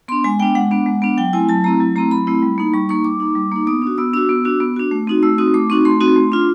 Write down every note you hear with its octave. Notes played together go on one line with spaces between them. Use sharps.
B3 D4 C6
G#3 G#5
B3 D4 G5
G#3 F#5
B3 D4
G#3
B3 D4
F#3 G5
A3 C4 E4 G#5
F#3 A5
A3 C4 E4 A#5
F#3
A3 C4 E4 A#5
F#3 B5
A3 C4 E4
G3
A#3 D#4
G3 C#6
A#3 D#4 C#6
G3 D6
A#3 D#4
G3
A#3 D#4
B3 D#6
D4 F#4
B3 E6
D4 F#4 E6
B3
D4 F#4
B3
D4 F#4
A3
C4 D#4 F#4
A3 E6
C4 D#4 F#4 D#6
A3 D6
C4 D#4 F#4 C#6
A3 C6
C4 D#4 F#4
A3
D4 F4